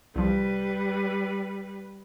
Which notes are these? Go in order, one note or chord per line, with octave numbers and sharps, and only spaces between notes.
C2 F3 G3 B4